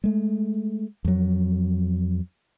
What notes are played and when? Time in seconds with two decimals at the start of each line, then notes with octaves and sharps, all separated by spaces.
0.04 G#3 A3
1.05 F2 F#3